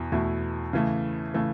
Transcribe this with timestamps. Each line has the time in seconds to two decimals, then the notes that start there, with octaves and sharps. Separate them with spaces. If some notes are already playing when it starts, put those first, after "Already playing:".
Already playing: E2 B2 E4
0.12 E2 B2 A3 E4
0.73 C#3 E3 A3
1.34 C#3 E3 A3